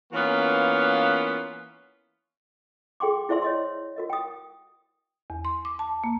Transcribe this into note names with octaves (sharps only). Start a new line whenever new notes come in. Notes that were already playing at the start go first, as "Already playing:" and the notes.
E3 A#3 B3 C#4 F4
G#4 G5 C6 D6
E4 C5 D5 E5 C6 E6
C#5 D#5 C6
F#4 A#4 D#5
G5 D#6
E2
C6
D6
A5
A#3